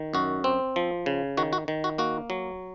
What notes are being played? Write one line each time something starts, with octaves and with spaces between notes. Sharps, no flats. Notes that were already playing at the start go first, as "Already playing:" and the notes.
Already playing: D#3
F#2 F#4
C4
F3
C#3
D#3 F#4
F#4
D#3
F#4
A#3 F#4
F#3